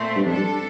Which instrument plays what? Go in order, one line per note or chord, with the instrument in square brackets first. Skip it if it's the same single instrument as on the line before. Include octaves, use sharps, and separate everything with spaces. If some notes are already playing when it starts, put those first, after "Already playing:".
Already playing: [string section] A#2 A3 C4
[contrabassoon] G2
[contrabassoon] F2 [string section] G3 D4 A4
[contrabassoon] G2